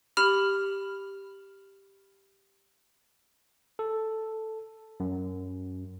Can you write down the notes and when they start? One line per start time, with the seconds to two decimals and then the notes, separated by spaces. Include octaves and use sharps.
0.17 G4 B5 F6 F7 F#7
3.79 A4
5.00 F#2